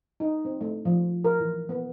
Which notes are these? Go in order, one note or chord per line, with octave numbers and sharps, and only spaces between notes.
D#4
C4
A3
F3
A#4
E3
B3